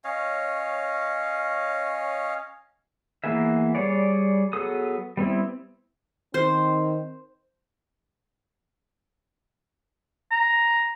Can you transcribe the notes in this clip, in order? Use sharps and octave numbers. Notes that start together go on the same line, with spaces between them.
C#4 C#5 D#5 F5
E3 A#3 B3 G#4 E5
G3 G#4 C#5 D5
F#3 B3 G#4 A4 D#6
G3 B3 C4 E4
D#3 C4 C5
A#5